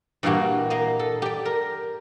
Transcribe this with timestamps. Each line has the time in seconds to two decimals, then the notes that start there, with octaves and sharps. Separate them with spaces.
0.23 G2 A#2 E3 A#3 F#4 G4
0.70 A#3 D#5
0.99 A4
1.22 G4 D5
1.45 A#4